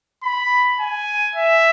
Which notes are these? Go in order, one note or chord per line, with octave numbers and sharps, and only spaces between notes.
B5
G#5
E5